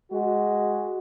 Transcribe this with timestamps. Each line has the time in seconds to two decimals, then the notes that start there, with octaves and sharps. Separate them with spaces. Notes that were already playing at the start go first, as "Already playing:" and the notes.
0.12 G#3 F#4